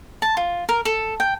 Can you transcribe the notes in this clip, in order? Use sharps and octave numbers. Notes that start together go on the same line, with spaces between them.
A5
F4
A#4
A4
G5